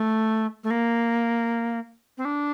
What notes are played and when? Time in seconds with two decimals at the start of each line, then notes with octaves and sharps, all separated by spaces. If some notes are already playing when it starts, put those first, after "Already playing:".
Already playing: A3
0.64 A3
0.70 A#3
2.18 C4
2.25 D4